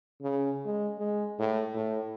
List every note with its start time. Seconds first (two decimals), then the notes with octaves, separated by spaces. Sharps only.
0.22 C#3
0.66 G#3
0.98 G#3
1.39 A2
1.74 A2